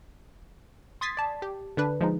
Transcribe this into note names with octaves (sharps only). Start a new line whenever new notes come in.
C6 D#6 G#6 A6 B6 C7
D5 A5
G4
D3 D4 B4
F3 G#3 D#4